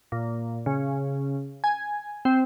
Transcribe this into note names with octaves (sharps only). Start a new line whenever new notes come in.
A#2
C#3
G#5
C4